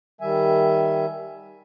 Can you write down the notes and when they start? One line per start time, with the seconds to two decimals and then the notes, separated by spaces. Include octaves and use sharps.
0.21 D#3 G3 E5 G#5